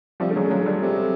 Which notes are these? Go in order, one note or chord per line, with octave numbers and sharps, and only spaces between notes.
C3 F3 G3
D3 A3
F#3 G#3
C#3
F#3 G#3
D3
G3 A3
C3